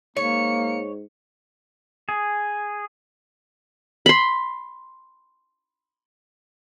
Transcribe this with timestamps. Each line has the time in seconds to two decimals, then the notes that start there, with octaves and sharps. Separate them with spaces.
0.17 G#2 A#3 C#5 C#7
2.09 G#4
4.06 B5 C6